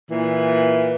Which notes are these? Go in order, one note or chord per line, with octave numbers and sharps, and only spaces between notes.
A#2 E3